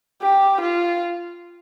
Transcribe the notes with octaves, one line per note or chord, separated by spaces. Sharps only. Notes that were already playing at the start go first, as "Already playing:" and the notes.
G4
F4